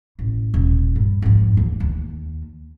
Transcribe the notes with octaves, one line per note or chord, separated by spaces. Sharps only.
A1
D#1
G2
F2 G#2
D#2
D#2